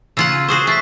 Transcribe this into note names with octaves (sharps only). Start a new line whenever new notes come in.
C#3 F4 F#5 E6 G#6
D#7
F#4 G#4 C5 C#6 D#6 C7
A3 C#6 A6 B6